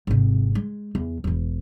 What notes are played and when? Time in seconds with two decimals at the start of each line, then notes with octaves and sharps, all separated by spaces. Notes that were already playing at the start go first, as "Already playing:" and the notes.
0.07 G#1 C3
0.55 G#3
0.95 E2
1.24 E1 E3